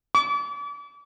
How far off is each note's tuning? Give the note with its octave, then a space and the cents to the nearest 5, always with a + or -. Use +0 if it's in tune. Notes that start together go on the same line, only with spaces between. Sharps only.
D6 -35